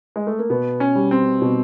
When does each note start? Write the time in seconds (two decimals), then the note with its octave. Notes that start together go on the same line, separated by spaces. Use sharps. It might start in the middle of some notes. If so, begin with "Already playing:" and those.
0.16 G#3
0.27 A3
0.39 A#3
0.49 B2 B3
0.80 C#4
0.95 G3
1.11 C4
1.41 B2